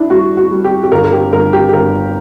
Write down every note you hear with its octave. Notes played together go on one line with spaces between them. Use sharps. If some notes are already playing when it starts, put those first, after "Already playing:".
Already playing: D4 E4
G3 F#4
F#4
G3
G4
G4
G1 A#4
A#4
G4
G1 A#4
G4
G4
G1 A#4